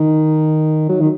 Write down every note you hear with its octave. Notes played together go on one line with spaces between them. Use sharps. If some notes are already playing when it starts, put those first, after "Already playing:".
Already playing: D#3
F#3
D#3